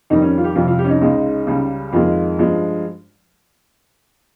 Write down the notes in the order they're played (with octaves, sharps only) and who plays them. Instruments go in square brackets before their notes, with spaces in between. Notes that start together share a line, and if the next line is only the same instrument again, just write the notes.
[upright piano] F2 D#3 G3 D#4
C#4
F4
G4
F2 C3 G3 F4
F4
G4
C#4
D#4
C#2 C#3 G#3
C#2 C#3 G3
F2 D#3 G#3 F4
G2 F3 G#3